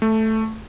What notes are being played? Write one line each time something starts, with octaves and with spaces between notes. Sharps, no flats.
A3